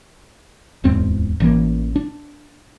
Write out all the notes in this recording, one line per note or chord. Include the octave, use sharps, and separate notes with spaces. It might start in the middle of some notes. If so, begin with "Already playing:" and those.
D1 E2 G#2 C4
A1 E3 A#3
D4